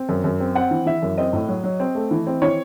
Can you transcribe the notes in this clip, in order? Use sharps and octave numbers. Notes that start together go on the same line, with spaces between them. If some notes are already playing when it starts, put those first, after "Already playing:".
Already playing: C4
F#2
F#2
C4
C4 F#5
E3
E3 E5
F#2
C4 D#5
A2
F#3
F#3
C4
A3
E3
C4
E3 C#5